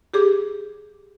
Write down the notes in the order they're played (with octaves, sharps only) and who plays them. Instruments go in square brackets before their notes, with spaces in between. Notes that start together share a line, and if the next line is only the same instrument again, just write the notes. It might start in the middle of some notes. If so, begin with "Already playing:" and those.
[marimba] G4 G#4 D6